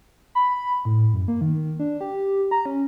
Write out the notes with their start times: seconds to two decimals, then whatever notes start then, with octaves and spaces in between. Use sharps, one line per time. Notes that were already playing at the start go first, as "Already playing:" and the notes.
0.35 B5
0.85 A2
1.13 F#2
1.28 A#3
1.41 D#3
1.79 D4
2.01 G4
2.51 A#5
2.66 C#4